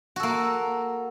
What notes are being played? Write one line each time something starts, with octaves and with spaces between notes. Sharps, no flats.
A#3 F#4 A4